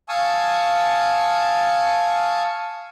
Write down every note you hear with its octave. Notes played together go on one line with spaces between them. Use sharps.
F5 G#5 A5 C#6 D#6 E6